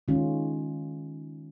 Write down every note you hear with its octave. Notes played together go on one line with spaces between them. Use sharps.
D#3 G#3 C#4 F4